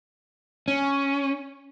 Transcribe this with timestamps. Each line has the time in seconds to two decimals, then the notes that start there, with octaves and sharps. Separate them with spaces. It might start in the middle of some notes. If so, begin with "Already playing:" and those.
0.68 C#4